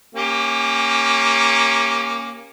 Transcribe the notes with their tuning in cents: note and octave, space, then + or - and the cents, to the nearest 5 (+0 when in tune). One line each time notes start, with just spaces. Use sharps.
A#3 +5 C#4 -10 G4 +25